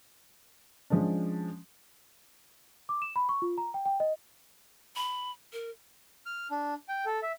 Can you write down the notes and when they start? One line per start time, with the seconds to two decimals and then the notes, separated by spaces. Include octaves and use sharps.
0.90 F3 G#3 C#4 D4
2.89 D6
3.02 E7
3.16 B5
3.29 C#6
3.42 F4
3.58 A#5
3.74 G5
3.86 G5
4.00 D#5
4.96 B5
5.53 A#4
6.26 F6
6.51 D4
6.89 G5
7.06 A4
7.23 E5